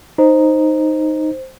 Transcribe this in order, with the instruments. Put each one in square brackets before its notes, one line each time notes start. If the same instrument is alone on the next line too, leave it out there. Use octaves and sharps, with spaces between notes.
[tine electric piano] D#4 [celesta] C5